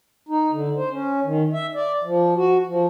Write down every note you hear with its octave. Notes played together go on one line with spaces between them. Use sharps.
D#4
D3
C5
C#4
D#3
E5
D5
F3
F#4
F3